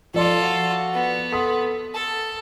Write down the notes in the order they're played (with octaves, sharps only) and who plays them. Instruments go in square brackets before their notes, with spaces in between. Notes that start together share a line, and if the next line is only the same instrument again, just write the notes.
[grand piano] F3 D5 C6 [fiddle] F4 A4
[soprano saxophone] F#4
[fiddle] B3
[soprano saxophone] A4 [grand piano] C6 D#6 B6
[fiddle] A4 [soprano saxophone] A5